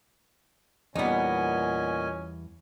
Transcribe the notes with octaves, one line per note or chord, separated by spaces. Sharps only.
E2 A#2 G3 B3 C#4 D#4 D#5 G#5